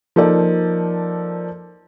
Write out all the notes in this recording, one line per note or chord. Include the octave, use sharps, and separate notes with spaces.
F3 A#3 D#4 A4 D5